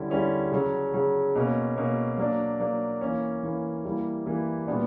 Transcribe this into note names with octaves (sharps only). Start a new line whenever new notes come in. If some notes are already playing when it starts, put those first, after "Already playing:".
Already playing: D3 G3 C#4 E4
D3 G3 C#4 E4
C#3 F#3 C#4
C#3 F#3 C#4
B2 A#3 C#4
B2 A#3 C#4
F#3 A#3 D4
F#3 A#3 D4
E3 A#3 C#4
E3 A#3 C#4
E3 G3 A#3 E4
E3 G3 A#3 E4
A#2 G3 B3 D4